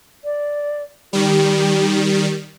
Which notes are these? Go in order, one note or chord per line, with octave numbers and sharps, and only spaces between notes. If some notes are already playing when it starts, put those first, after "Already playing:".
D5
D#3 G3 G4